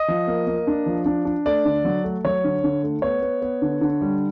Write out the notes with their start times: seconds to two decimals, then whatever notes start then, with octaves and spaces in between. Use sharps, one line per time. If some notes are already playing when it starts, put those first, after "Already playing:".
Already playing: D#5
0.08 F3
0.27 A#3
0.47 A#3
0.67 D4
0.86 F3
1.06 D4
1.25 D4
1.46 A3 D5
1.65 D3
1.85 F#3
2.04 A3
2.25 F#3 C#5
2.44 D3
2.64 D3
2.83 A3
3.02 B3 C#5
3.22 B3
3.42 B3
3.62 D3
3.81 D3
4.01 G3